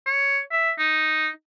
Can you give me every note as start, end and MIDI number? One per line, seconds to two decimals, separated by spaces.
0.06 0.40 73
0.51 0.72 76
0.79 1.29 63